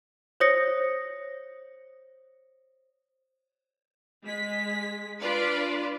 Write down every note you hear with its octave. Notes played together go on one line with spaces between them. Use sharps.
C5 C#5 D#6 A#6 C#7
G#3 B6
D4 F4 B4 D5